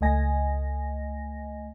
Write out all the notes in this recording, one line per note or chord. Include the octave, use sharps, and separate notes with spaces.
C#2 A3 D#5 G#5 A#6